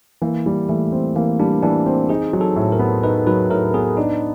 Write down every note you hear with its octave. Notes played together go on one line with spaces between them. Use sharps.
E3 A#3
G3
E3 A3
C4
E3 A#3
G3 D4
E3 D4
C4
D#4 G#4
F#3
A4
A2
A#4
B3
D#4 B4
F#3 B4
A2 A#4
B3 G#4
D4 D#4